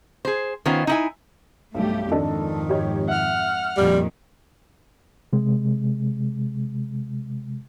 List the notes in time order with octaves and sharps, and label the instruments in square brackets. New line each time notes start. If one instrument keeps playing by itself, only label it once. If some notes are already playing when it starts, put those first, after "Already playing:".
[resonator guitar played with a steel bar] G#4 C5
D#3 B3 C#4 F4 C5
D#4 E4 G#5
[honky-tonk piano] B1 G2 [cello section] A3 G4
[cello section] F2 G#2 [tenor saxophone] D#3 [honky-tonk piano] D4 A4 D#5
[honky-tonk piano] G4 C#5 D#5
[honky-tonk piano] E5 [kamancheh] F#5 F6
[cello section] F2 A#2 D#3 [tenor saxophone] G3
[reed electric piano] C3 G#3